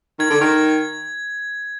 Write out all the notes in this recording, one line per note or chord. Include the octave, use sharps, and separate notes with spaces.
D#3 G#6
D3
D#3